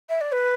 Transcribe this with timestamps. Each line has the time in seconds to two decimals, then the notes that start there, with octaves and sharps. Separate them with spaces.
0.09 E5
0.21 D5
0.32 B4